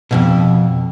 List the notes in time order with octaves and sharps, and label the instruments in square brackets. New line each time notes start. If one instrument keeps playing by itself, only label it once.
[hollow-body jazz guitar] F2 G#2 B2